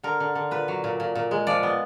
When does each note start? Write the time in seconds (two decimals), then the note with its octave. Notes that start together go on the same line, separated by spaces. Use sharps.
0.03 D3 A#4
0.20 D3
0.35 D3
0.51 A#2 B4
0.68 F#3
0.84 A#2
1.00 A#2
1.15 A#2
1.31 G#3
1.47 F3 D5
1.63 B3